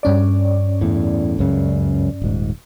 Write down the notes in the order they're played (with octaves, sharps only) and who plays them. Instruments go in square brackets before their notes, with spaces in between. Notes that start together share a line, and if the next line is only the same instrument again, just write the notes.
[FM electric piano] G2 C#4 D5
[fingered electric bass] E2 A2
C#2 F#2 C#3
D#1 G#2